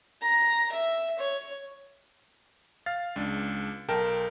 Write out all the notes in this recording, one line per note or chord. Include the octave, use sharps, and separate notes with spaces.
A#5
E5
C#5
F5 A6
C#2 D4
B1 A#4 G5 A5